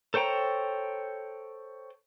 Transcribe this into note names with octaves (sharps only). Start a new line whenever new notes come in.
A4 C5 C#5 G5 A#5